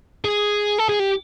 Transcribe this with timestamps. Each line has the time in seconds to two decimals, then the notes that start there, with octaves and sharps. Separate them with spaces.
0.25 G#4
0.79 A4
0.89 G#4
1.00 G4